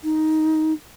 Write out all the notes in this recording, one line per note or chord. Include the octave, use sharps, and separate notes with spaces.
D#4